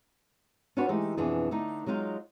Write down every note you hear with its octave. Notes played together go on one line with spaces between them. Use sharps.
C#4 D4 F4 F#4 B4 C#5
E3 G#3 A3 D#4 G4
F2 B2 E3 D4 G#4
D3 A3 D#4
F#3 G#3 D#4 F4 F5